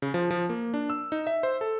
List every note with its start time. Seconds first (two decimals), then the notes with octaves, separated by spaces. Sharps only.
0.02 C#3
0.14 F3
0.31 F3
0.49 A#3
0.74 D4
0.90 E6
1.12 D#4
1.27 E5
1.43 C5
1.61 A4